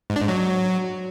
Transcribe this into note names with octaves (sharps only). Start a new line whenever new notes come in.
G#2
D4
G#2
F#3